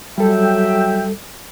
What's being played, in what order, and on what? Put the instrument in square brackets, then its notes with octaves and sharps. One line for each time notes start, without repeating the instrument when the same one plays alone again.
[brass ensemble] F#3 E5 G5 [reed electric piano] G3 A4